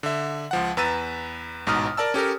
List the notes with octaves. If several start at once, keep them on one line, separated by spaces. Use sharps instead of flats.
D3 E5
C#2 F3 F#5
E2 B4 A#5 E6 A6 D#7
A1 G#2 B2 A#5 D#6 F6
A#4 D5 A5 E6
C#4 G4 A4 A#4